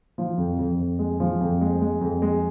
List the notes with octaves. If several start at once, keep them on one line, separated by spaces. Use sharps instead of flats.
F3
F2
F2
F2
G#3
F3
F2
G#3
G#3
F2
G#3